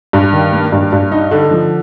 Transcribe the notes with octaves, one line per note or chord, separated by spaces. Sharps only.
G2
D#3
A#3
G2
G2
D#4
D3
F3